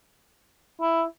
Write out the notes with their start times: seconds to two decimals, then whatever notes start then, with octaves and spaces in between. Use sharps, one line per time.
0.81 E4